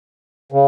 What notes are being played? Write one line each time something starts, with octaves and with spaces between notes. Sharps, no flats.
C#3